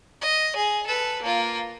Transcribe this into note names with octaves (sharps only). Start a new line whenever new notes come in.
D#5
G#4
A4 B4
A#3 F4